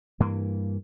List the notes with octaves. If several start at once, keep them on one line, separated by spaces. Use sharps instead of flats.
G2 E3 A#3